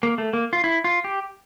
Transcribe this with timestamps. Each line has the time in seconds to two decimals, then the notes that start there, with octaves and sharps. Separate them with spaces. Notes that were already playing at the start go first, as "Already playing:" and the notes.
0.03 A#3
0.18 A3
0.33 A#3
0.53 F4
0.64 E4
0.84 F4
1.04 G4